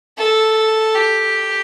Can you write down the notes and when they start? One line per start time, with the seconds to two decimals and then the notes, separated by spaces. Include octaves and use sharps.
0.18 A4
0.95 G4